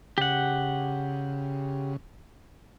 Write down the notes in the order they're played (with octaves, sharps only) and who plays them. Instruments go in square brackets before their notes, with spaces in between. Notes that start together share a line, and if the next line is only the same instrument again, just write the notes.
[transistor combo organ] C#3 [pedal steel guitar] G4 F#5